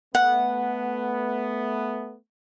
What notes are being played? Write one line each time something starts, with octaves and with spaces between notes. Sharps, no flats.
A3 B3 F#5